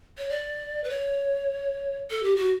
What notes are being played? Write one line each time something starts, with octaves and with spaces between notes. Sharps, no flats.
C#5
D5
B4
C#5
A4
G4
F#4